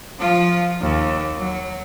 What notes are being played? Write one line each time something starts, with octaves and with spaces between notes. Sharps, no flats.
F3 F4
D#2
F#3